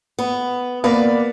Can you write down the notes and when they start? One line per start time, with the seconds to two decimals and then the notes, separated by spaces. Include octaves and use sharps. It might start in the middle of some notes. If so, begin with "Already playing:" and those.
0.19 B3
0.84 A#3 B3 B4 D5